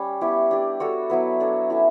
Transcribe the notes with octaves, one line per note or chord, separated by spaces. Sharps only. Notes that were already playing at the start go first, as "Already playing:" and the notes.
Already playing: G3 C#4
B3 E4 G4 C#5
D4 G4 D5
D4 F#4 A4 C#5
F#3 B3 E4 B4
D4 A4 C#5
C#4 E4 A4 E5